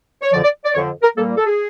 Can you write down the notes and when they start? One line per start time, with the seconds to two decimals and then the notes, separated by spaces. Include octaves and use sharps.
0.22 C#5
0.32 F2 D3 F3 D5
0.43 D5
0.65 D5
0.75 F2 D3 F3 C#5
1.03 A#4
1.17 A#2 G3 A#3 A4
1.37 A4
1.45 G#4